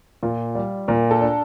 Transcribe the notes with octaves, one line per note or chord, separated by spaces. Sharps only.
A#2 F4
G3
A#2 A#4
A4
D4